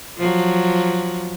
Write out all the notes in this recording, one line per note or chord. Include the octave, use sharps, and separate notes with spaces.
F3 F#3